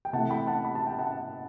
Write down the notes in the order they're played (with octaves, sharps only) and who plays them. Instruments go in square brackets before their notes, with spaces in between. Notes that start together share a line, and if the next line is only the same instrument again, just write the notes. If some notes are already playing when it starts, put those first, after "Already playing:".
[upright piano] G5
C3 E3 A3 F#5 A5
G5 B5
F#5 A5
B5
A5
G5
F#5 A5